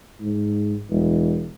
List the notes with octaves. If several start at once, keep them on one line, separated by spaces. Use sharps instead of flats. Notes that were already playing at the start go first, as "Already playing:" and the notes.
G#2
E1